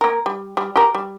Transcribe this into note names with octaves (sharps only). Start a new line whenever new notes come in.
A#3 A#4
G3
G3
G4 A#4
G3